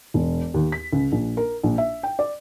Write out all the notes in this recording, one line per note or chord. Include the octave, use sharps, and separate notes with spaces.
E1
D#2
B6
C#2
A#1
A#4
A#1
E5
G5
D5